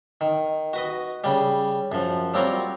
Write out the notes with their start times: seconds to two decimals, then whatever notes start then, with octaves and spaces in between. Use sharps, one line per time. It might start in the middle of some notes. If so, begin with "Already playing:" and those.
0.21 D#3
0.73 F#4 B4 D#5
1.24 C#3 G3
1.92 F#2 F3
2.34 F#3 G3 C4 F4 A#4 C#5